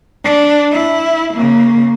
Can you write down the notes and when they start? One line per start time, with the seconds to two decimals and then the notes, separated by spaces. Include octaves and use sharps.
0.24 D4
0.72 E4
1.34 C#3 A#3